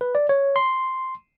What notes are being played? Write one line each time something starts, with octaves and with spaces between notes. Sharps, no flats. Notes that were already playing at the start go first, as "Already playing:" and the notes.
B4
D5
C#5
C6